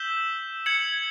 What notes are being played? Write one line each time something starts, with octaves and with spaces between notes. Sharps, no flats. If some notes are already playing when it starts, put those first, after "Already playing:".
Already playing: E6 G6 B6 E7 G7
G#6 C#7 F#7